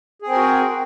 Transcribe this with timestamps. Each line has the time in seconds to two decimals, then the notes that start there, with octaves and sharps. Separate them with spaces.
0.22 G#4
0.27 C4
0.31 A#4
0.36 F#4